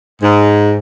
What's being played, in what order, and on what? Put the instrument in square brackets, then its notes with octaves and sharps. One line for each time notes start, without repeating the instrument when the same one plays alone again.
[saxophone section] G#2